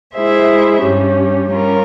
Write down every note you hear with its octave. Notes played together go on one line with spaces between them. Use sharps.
G#3 E4 G#4 C5 E5
G2 G3 C#4 G4
G3 C#4 F4 A#4